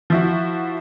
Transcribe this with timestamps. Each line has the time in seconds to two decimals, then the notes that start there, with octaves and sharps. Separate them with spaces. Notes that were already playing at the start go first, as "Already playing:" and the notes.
0.10 F3 E4 F#4